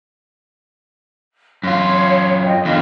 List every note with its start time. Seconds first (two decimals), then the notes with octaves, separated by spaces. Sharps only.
1.63 F#2 F4 C#5
2.46 D#5 G5
2.65 E2 D3 F4